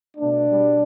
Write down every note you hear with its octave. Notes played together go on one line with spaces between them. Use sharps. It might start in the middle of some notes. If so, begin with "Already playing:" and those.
B2 A3 D4
B2 G3